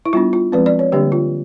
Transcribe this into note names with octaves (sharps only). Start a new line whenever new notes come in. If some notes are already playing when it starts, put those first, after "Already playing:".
E4
G3 B3 D4 F4
F4
F3 G#3 C4 B4
D5
C#5
D3 G3 A#3 D4 G4
F4